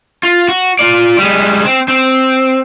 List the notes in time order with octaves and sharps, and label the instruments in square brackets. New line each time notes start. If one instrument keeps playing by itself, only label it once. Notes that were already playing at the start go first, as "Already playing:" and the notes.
[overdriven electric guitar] F4
F#4
F4 D5
G3 G#3
C4
C4